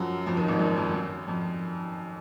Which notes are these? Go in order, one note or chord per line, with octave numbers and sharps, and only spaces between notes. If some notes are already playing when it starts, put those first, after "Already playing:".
Already playing: F#2 F3 F#3
F2 F3
D#2 D#3
G#1 G#2
F#2
F2
F#2
F2